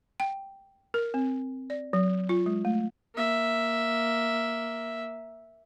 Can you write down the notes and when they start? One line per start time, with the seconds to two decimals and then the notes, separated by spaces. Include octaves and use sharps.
0.20 G5
0.94 A#4
1.14 C4
1.70 D5
1.93 F#3
2.29 F4
2.46 G#3
2.65 A3
3.14 A#3 E5